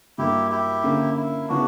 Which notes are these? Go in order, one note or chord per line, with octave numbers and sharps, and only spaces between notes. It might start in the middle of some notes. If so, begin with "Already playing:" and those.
G2 F#3 A#3 E4 G4
E4 G4
D3 A#3 C#4
E4
C#3 F#3 B3 D4 E4 F#4